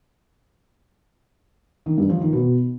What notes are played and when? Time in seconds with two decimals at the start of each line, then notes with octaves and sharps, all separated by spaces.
1.86 D#3
1.98 G2
2.09 F3
2.21 D#3
2.33 B2